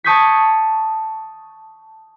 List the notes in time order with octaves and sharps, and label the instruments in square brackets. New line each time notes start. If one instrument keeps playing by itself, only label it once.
[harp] A5 C#6 D#6 G6 G#6 B6